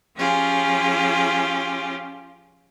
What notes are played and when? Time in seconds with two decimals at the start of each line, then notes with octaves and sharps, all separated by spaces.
0.16 F3 C#4 F4 G4 G#4